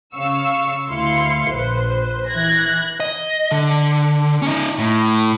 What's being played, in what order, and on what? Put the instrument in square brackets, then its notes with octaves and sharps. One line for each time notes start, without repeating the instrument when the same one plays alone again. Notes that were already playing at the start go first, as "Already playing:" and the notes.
[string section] C#3 F5 C#6 E6
D2 E4 F5 C6 C#7
A#1 B4 C5
E3 F#6 G#6 A#6
[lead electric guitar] D#5
D3
C#4 D#4
A2